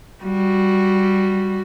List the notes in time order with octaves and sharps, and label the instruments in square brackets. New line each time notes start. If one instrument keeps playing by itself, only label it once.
[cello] G3 F#4